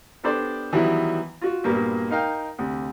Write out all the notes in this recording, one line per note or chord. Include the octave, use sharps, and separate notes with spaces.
B3 D4 G4 A4 C5 D5
D#3 E3 F#3 G3 B3 E4
F4 F#4
G2 A#2 A#3 B3 F#4
D#4 A#4 F5 G5
D2 C3